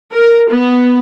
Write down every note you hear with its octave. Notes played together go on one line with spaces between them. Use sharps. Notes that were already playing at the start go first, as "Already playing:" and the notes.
A#4
B3